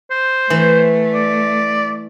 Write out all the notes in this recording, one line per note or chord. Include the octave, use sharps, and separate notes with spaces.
C5
E3 A3
D5